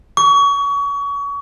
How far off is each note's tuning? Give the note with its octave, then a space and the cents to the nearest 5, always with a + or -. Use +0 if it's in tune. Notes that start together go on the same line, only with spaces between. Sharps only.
C#6 +30